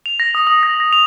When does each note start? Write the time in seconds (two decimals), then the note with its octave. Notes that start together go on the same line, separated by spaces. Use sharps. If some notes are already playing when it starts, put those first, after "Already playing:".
0.06 F7
0.20 A#6
0.35 D#6
0.47 D#6
0.63 A#6
0.80 A#6
0.93 F7